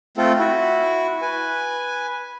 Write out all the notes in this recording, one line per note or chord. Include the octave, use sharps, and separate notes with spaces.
A3 C4 F4 A4
E4 F#4
B4 G#5